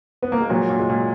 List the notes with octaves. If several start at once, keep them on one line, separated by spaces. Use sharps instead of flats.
B3
A#3
G#3
A#2 F#3
A#2
G#3
A#2